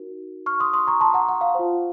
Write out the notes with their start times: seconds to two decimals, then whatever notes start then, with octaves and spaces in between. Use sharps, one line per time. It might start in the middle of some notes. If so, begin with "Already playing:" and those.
Already playing: D#4 F#4 A#4
0.46 C#6 F6
0.60 C6 D#6
0.73 C6 D#6
0.87 A#5 C#6
1.00 A5 C6
1.14 F#5 A#5
1.29 F#5
1.41 F5
1.55 F4 C5